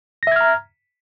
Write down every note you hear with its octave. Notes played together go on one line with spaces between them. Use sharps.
E5 A#5 F6 G#6 A#6